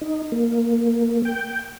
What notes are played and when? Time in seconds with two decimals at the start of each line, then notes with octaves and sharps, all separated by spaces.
0.01 D#4
0.32 A#3
1.25 G5